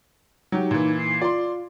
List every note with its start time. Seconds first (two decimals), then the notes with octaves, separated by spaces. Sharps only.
0.52 F#3 D#4 G4
0.71 A#2 E3
0.99 C7
1.21 F4 D5 C6